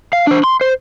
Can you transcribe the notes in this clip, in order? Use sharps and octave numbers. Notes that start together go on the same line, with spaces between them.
F5
D4 C5
C6
C5